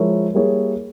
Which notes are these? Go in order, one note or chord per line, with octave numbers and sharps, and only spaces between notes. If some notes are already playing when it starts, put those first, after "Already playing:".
Already playing: F3 G#3 E4 A#4 C#5
G3 A#3 E4 G#4 C#5